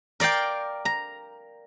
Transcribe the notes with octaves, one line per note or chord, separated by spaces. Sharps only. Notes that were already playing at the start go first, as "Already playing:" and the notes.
A#4 D5 F5 G5
A#5